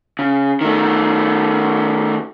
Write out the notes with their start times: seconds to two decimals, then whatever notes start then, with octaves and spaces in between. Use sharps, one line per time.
0.19 C#3
0.61 D#3 A3